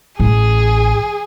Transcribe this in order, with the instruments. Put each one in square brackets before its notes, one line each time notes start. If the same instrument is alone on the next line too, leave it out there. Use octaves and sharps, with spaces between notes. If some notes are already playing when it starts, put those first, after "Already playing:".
[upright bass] A1 [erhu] G#4